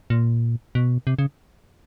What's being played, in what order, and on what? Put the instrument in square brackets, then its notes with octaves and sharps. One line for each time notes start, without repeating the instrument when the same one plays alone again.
[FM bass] A#2
B2
C3
C#3